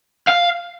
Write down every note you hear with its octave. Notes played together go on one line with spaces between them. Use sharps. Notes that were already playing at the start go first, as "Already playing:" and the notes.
F5